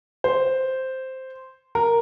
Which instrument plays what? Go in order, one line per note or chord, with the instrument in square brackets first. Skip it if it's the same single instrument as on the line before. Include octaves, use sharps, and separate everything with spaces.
[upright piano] C5
A#4